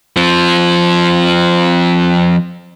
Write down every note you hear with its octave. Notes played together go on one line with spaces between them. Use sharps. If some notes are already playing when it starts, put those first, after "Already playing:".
F3 C4